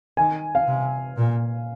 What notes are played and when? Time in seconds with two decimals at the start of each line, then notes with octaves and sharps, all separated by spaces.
0.17 D#3 G#5
0.55 F5
0.67 C3
1.17 A#2